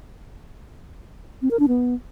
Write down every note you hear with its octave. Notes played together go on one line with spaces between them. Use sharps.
C4
A#4
D4
B3